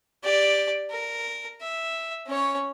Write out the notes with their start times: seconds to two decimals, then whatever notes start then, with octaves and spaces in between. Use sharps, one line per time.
0.24 G4 D5
0.91 A#4
1.61 E5
2.27 C#4 C#5